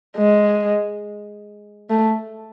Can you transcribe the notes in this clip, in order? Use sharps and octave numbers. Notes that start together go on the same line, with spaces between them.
G#3
A3